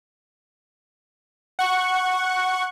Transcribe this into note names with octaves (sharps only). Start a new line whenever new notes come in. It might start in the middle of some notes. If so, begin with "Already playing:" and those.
F#5 C#6